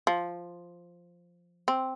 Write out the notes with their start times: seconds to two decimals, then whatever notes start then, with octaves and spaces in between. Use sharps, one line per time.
0.07 F3
1.68 C4